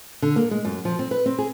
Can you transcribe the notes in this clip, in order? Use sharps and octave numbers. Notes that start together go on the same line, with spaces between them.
D3
A#3
G#3
F#2
F3
C4
B4
C4
G#4